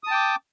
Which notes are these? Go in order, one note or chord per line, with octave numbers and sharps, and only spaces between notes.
G5 A5 D6 D#6